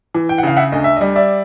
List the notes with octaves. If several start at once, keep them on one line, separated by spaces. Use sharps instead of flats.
E3
G5
F#5
C#3 F5
E5 F#5
D2 D#5
E5
D#5
G3
D5 E5